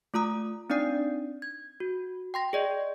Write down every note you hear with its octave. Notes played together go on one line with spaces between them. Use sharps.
A3 F4 A#5 D#6
C4 D4 D#4 D5 D#6 C7
G#6
F#4
G5 C6 A#6
G#4 D5 D#5